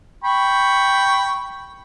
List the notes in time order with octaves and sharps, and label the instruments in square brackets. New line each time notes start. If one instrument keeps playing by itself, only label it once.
[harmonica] G5 B5 C#6